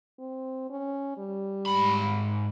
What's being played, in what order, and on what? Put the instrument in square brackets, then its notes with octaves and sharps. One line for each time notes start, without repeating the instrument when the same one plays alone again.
[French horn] C4
C#4
G3
[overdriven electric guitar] G#2 B5